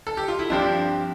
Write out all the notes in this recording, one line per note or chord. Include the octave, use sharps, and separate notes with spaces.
A4
G4
F4
E4
G2 F3 C4 D4 G4